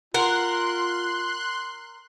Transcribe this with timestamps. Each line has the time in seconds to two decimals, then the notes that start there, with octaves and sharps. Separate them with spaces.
0.14 F4 A#4 F#5 C6 F#6